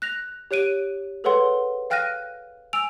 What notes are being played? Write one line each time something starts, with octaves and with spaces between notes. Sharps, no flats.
F#6 A#6 F7
G4 C#5 F#6 D7 D#7
G#4 A4 B4 C#5 F#5 C6
F5 G5 F6 F#6 A#6 D#7
G#5 E6 D7 F7